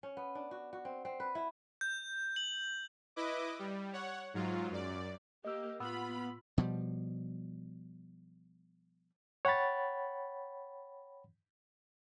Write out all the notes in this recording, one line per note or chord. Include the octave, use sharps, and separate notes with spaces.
C#4
B3
D4
F#4
F#4
C4
C4
B4
E4
G6
F#7
E4 B4 D#5 D6
G3
C#5 F#5
G#2 F#3 F4
F#2 D5
A#3 G4 D#5 E6
A2 B3 F4 B5 E6
B2 F3 G3
C#5 F#5 G5 B5 A6